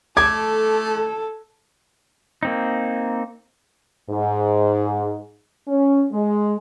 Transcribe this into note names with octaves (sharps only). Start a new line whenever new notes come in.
A3 A4 D6 G#6
A#3 C4 D#4
G#2
C#4
G#3